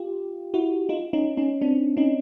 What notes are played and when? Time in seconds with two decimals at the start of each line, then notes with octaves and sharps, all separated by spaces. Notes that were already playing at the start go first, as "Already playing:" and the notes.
Already playing: F4 G4
0.54 E4 F#4
0.89 D#4 F4
1.13 C#4 D#4
1.37 C#4 D#4
1.61 C4 D4
1.97 C#4 D#4